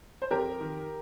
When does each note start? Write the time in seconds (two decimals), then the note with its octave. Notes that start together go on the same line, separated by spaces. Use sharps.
0.22 C5
0.31 F2 G4 A#4
0.60 D#3